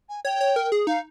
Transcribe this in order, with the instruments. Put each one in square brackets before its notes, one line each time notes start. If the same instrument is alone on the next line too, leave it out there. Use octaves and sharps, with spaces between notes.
[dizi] G#5
[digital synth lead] C#5 [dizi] G5
[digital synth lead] C#5
A#4
G#4
[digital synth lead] D#4 [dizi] F5